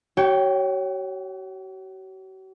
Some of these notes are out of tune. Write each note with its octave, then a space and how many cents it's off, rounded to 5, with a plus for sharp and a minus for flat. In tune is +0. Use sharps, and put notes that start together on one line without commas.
F#4 +45 C#5 +0 G5 +0